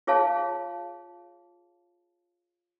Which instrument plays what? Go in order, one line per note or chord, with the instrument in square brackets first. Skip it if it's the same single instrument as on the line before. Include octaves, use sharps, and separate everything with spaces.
[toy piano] F4 G#4 C#5 F5 A5